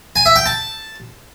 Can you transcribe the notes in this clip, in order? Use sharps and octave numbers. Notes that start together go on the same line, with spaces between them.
G#5
E5
G5
A5